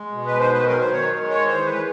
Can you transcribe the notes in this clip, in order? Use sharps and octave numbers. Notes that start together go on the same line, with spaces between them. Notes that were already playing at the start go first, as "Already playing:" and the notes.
Already playing: G#3
B2
B4
D#3 C5
B4
F#3 A#4
C5
D#3 C#5
G#3
C#5
E3 C5
B4
G#3